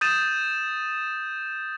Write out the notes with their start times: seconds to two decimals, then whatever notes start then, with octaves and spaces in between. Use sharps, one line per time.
0.01 D#6 G6 A6 D#7 E7